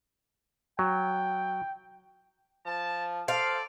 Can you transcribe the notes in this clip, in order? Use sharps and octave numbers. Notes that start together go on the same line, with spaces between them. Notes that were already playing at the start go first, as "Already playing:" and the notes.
F#3 G5
F3 A5
A4 C5 D5 F5